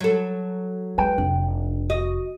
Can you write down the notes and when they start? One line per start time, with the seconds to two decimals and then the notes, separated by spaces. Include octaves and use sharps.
0.01 F#3 A4
0.98 G#3 B4 G5
1.18 F1 D4
1.90 F#4 D#5